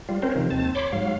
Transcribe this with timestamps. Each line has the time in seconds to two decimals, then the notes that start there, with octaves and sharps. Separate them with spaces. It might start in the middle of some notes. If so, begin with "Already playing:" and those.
0.09 G3 F4
0.22 C4 C#4 A#4 C5
0.35 C3 D#3 F3
0.50 D#2 C4 A5
0.75 C#5 B5 C6 D6
0.92 G#2 F#3 F5